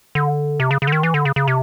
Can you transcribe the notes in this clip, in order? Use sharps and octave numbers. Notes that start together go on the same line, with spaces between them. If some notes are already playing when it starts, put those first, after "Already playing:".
D3
C3
C#3
C#3
D3
D#3
E3
D3
C#3
C#3
C3